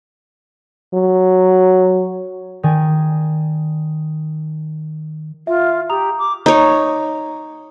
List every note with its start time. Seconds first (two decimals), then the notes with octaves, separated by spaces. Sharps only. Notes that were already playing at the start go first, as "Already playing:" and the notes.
0.94 F#3
2.63 D#3 D5 G#5 G#6
5.47 F4 E5
5.90 G4 A#5 D#6 F7
6.18 D6
6.46 D#4 C#5